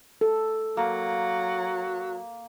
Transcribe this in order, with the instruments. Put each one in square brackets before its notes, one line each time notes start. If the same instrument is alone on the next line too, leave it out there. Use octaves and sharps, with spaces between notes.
[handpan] A4
[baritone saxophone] F#3 [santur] A#3